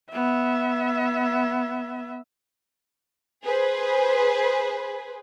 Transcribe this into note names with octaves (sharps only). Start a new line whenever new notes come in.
B3 E5
G#4 B4 C5